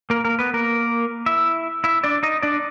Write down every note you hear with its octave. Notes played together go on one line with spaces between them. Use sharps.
A#3 A#4
A#3 A#4
B3 B4
A#3 A#4
E4 E5
E4 E5
D4 D5
D#4 D#5
D4 D5